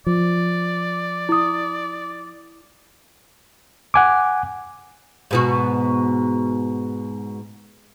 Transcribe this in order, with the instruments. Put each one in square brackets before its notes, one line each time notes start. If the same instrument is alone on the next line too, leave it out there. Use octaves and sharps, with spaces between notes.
[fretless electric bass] F3 [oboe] D5
[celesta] E4 D#6
[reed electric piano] F#5 G#5 D6
[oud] G#2 B2 F#4